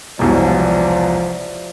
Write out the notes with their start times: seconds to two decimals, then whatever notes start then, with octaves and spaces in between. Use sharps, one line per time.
0.19 E1 C2 B2 F3 D5